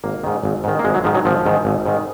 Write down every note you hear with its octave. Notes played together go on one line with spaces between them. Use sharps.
G#1 A#3
G#2 D#3
G#1
G#2 D#3
A#3
G#1 G#3
F#3
G#2 D#3 F3
F#3
G#1 F3
G#2 D#3
G#1
G#2 D#3